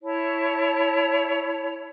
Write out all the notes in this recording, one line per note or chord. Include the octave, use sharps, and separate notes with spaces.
E4 C#5 A5